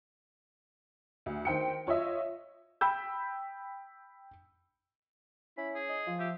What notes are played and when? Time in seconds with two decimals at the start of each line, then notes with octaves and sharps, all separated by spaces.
1.26 D2
1.45 D#3 C5 G5 C#7
1.87 F4 C#5 D#5 E5
2.81 G5 B5 E6 G6
5.57 C#4 E4 B5
5.75 G#4
5.89 D#5
6.07 F3 F4
6.20 G4 E5